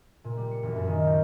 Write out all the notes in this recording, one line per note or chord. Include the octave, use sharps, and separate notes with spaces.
A#2
G3
C#7
E1
F#2
D#3
G6